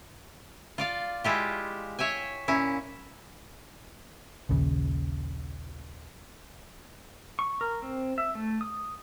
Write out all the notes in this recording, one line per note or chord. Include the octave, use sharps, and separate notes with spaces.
F4 D5 F5
G#3 E4 F4 G4
C#5 E5 G5 G#5
A#2 C#4 E4
A#1 D#2 C#3
C#6
A#4
C4
E5
A3
D#6